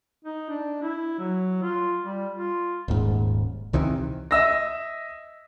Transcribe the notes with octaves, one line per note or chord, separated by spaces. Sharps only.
D#4
D4
E4
F#3
F4
G3
F4
D#1 G#2
C#2 C3 D#3 E3
D#5 E5 E6 A#6